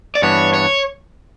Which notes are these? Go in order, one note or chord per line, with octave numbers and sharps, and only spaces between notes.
D5
G2 E3 B3 D4 C#5
C#5